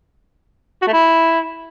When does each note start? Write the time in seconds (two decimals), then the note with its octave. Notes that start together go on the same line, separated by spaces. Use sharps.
0.82 F#4
0.87 A3
0.93 E4